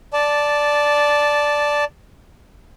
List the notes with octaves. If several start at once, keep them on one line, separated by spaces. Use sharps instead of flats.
D5 A5